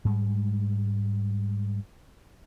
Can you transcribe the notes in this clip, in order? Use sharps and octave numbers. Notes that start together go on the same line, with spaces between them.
G#2 G3 G#3